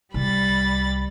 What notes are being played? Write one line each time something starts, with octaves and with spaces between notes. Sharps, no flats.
C2 G3 B5 A6